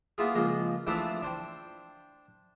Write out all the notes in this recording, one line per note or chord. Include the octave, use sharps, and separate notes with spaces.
A#3 B3 E4 F4 G#4
C#2 F3 G#3 A#3
E3 F3 A3 C4 D4 E4
D4 C5 G5